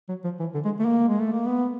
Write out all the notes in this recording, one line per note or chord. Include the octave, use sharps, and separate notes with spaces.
F#3
F3
E3
D3
G#3
A3
A#3
G#3
A3
A#3
B3